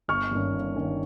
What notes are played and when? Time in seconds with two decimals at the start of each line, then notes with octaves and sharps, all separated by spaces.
0.08 G1 C#6 F6
0.31 G2 D#3 A#3 C#4
0.54 G1
0.76 G2 D#3 A#3 C#4